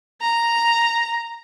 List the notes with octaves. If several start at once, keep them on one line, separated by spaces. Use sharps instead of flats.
A#5